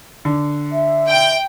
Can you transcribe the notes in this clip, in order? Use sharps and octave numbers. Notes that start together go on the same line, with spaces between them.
D3
E5
G5